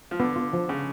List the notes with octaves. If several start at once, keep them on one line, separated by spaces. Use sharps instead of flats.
F3
D3 B3
F4
F3
C#3